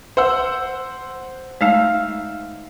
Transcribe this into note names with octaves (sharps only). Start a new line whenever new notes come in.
C5 F#5 E6
G#3 A3 D#4 E5 F5